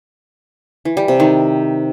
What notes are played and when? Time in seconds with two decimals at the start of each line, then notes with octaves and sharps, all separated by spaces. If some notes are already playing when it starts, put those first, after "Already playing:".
0.85 E3
0.97 G3
1.08 C3
1.20 D#3